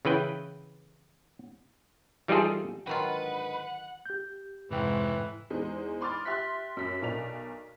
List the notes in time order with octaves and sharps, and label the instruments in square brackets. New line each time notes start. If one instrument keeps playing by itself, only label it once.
[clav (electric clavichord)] C#3 E3 B4 G5
E3 G3 D#4 F4 G#4 A4
[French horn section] G#2 D3 D#5 [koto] D#3 F#3 F4 [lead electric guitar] B4 [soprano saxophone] F#5
[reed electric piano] G4 G6
[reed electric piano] F2 C3 G5 [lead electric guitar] G#2 [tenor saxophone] E3
[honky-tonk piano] E2 G#3 D#4 C5
B5 C6 D6 D#6 F6 A6
G4 E5 C6 F#6 B6
F#2 B6
B1 A#4 D5 F7